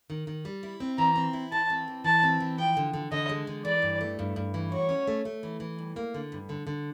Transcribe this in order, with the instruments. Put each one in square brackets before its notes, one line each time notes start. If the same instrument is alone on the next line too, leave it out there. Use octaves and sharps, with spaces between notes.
[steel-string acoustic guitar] D#3
D#3
G3
E4
C4
[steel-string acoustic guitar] E3 [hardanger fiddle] A#5
[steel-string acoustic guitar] C4
E4
[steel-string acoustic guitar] E3 [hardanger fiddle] A5
[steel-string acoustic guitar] C4
E3
[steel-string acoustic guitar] E3 [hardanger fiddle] A5
[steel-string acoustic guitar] C4
E3
[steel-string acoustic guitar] F3 [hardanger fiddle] G5
[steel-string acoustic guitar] D3
D3
[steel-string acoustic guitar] D3 [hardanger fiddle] D#5
[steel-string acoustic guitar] G#3
D3
[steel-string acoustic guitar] E3 [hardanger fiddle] D5
[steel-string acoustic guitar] G2
A3
G2
G2
E3
[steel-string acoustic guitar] F#4 [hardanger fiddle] C#5
[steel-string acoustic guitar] C#4
A3
A3
E3
E3
G2
A#3
D3
G2
D3
D3